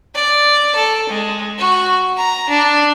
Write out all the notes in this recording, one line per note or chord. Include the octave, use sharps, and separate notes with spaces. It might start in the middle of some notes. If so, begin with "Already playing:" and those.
D5
A4
G#3
F#4
A#5
D4